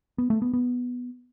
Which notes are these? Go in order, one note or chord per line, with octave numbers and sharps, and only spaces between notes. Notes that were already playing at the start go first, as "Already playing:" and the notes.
B3
A3
B3
B3